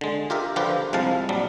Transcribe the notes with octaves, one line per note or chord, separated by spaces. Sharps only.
D3 G#3
F4 G4 A#4 E5
D3 F3 F4 G4 A#4 B4
C2 C3 F3 G#3 F5 A5
A#1 F#3 G3